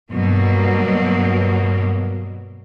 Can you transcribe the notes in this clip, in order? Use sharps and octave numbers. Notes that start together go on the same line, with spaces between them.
G2 B2 F#3 A#3